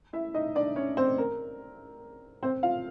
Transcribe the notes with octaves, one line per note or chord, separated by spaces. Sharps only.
E4 E5
D#4 D#5
D4 D5
C#4 C#5
C4 C5
A#4
C4 C5
F4 F5